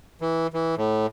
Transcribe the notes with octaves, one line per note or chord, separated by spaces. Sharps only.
E3
E3
A2